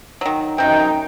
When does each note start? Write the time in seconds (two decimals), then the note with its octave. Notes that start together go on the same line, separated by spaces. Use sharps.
0.21 D#3 F#3
0.58 F#2 C3 D#3 D#4 G5